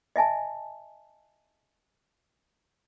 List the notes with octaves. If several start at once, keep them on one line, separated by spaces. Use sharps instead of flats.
D#5 E5 G#5 A5